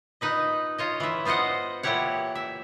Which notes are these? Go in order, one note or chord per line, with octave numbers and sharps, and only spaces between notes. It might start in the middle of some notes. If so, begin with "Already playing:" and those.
A#2 D#4 B4 D#5
F4 C#5 D#5
E3 E5
B3 F4 C5 D#5 F#5
A#2 E3 E4 G4 C#5 F#5
E5